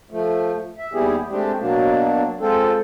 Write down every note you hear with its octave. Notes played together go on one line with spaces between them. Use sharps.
F3 A3
E5
D#2 G3 B3 E4 G4 G#4
G#3 A3 C4 D4 G4
B2 F#3 A#3 D4
G#3 C4 F4 A4